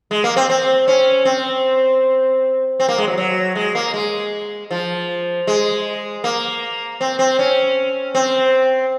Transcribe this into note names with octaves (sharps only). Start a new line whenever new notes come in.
G#3
A#3
C4
C4
C#4
C4
C4
A#3
G#3
F#3
F#3
G#3
A#3
G#3
F3
G#3
A#3
C4
C4
C#4
C4